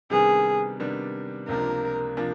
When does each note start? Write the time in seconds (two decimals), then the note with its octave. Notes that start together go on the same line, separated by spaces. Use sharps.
0.10 C3 D#3 G3 B3 D4 G#4
0.80 C3 D#3 G3 B3 D4
1.48 C#2 C3 F3 A#3 D4 A#4
2.17 C3 F3 A#3 D4